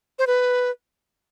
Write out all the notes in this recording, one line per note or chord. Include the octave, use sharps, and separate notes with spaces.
C5
B4